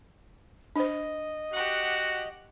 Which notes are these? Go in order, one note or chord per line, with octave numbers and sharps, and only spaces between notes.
D4 C5 D#5
F#4 G4 F#5